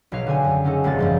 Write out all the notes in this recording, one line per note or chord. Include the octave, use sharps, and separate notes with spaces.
B1 B2 C#5 F5
D3 C4 G#5
F#2
C#3 C#4 D#4 A4
D#1 G#1 A#2 A#3 A6
F#2 F3 G#3